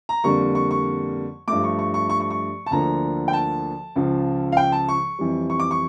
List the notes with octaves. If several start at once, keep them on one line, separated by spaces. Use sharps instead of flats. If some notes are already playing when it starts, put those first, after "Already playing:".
A#5
F2 D3 G3 A#3 C#6
C#6
C#6
G2 F3 A3 D6
C#6
C#6
C#6
C#6
C#6
C#6
A5
D2 D3 F3 A#3 A#5
G5
A5
C#2 C#3 F3
F5
G5
A5
C#6
F2 E3 G3
C#6
D6
C#6